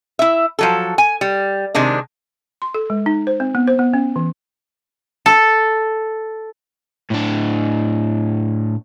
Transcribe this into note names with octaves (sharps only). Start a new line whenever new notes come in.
E4 E5
F3 F#3 A4
G#5
G3
C3 D#3 G#3 D4
C6
A4
G#3
D#4
C5
C4
B3
C5
B3
C#4
E3
A4
A2 D4